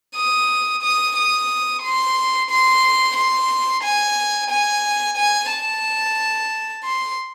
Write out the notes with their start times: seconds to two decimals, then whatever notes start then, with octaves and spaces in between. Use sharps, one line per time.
0.16 D#6
0.82 D#6
1.16 D#6
1.83 C6
2.50 C6
3.16 C6
3.83 G#5
4.50 G#5
5.17 G#5
5.50 A5
6.84 C6